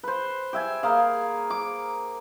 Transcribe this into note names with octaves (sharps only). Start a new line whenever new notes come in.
B4 C5
G4 E5 G#5
A#3 G#4 F5
D6